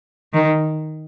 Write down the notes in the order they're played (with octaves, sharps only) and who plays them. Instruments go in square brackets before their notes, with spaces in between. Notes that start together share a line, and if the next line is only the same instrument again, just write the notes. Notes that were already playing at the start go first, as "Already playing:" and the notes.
[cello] D#3